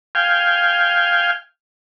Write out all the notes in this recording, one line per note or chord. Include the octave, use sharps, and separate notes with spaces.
F5 G5 G#5